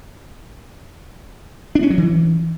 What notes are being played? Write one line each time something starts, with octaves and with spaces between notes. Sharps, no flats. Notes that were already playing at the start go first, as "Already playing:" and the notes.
D4
C#4
F#3
E3